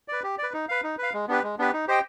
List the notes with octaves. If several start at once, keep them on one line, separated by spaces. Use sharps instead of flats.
B4 D5
G4
B4 D5
D#4
B4 F5
D#4
B4 F5
G#3
B3 D4 G4 B4
G#3
B3 D4 G4 B4
D#4
G4 C5 D#5 G5